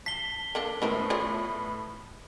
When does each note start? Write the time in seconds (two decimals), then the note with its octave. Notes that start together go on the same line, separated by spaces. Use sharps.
0.06 A5 B6 C7 G7
0.55 A#3 D4 A4
0.82 A2 A3 B3 C#4 A#4 C5
1.10 F4 C#5 D5